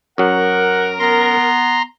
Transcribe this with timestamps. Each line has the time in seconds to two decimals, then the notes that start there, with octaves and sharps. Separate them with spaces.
0.18 F#2 F#3 A#4 F#5
0.99 B3 A#5 C6